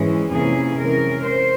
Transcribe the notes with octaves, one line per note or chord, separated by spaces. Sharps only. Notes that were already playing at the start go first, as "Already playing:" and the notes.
Already playing: G#2 E3 G#3 C#4
F2 C3 E3 A#3 C#4 G#4
C3 E3 G#3 C#4 A#4
C5